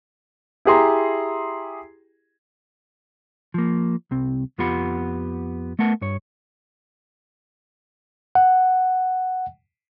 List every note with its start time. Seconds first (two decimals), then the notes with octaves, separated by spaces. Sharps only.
0.65 E4 G4 G#4 A#5 C6
3.54 F3 A#3
4.11 C2 C4
4.58 F2 B3 F4 G4 F#5 B5
5.79 A3 B3 A#4 F#5 A5
6.01 G2 C#5
8.35 F#5